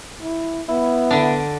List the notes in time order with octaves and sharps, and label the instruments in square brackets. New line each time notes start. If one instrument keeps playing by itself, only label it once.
[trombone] E4
[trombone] B3 [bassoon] E4
[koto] D3 D4